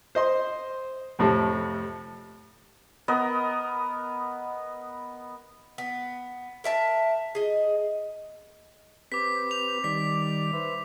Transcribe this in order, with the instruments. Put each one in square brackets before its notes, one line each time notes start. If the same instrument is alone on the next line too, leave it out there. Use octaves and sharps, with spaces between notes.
[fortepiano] C5 D#5 C6
F2 A2 C3
[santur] B3 A#4 D#5
[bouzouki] B3
A#4 E5 A5
G#4 D#5
[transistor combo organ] C4 G4 B4 [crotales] D6 B6
[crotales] F7
[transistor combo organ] D#3 G3 D5 [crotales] B6
[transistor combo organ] B4 C5 E5